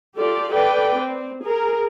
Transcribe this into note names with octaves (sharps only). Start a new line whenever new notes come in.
F4 G4 A4 D5
A4 B4 D5 G5
C4
G#4 A#4